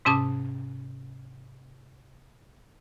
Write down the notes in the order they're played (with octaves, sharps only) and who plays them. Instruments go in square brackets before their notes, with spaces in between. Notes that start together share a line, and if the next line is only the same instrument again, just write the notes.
[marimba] G#2 C3 C#4 A5 D6 D#6